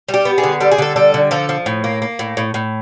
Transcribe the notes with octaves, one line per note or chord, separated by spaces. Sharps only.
G3
G4
B3
G#4
D3
G3 A4
G#4
D3 A4
G3 A4
D3
F3 A4
F3
A2
A#3
A#3
A2
A2
A2